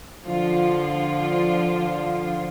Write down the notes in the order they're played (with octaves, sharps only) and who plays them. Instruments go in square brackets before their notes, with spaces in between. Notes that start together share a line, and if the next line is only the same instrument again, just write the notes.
[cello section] D3 F3 F4